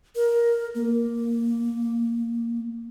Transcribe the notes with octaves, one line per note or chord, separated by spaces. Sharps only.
A#4
A#3